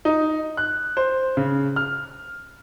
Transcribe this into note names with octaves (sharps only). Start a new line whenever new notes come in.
D#4
F#6
C5
C#3
F6